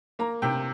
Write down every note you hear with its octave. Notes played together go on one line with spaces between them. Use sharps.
A#3 A#5
C3 G5